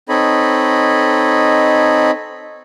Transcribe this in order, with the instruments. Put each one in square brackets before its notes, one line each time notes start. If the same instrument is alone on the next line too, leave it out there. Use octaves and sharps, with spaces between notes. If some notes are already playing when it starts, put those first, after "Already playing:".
[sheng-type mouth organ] C4 D#4 A4 C#5 D#5 B5